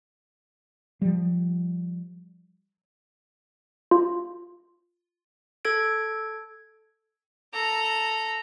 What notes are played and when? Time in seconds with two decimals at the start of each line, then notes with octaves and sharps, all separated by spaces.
1.02 F3 G3
3.91 F4
5.65 A4 G#6 D7
7.53 A4 A#5